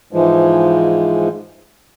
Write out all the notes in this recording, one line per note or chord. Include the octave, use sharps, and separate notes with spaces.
G#2 E3 F3 G#3